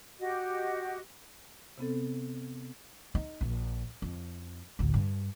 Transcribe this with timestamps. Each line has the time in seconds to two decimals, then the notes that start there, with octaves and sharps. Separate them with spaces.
0.19 F#4 G4 D#5
1.78 C3 B3 C4 A4
3.15 D#4
3.41 A#1
4.02 F2
4.79 A1 D2
4.94 G2